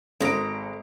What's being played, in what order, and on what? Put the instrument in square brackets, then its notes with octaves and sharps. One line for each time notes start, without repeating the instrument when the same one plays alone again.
[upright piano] G#1 A4 D7 [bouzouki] G#3 A#5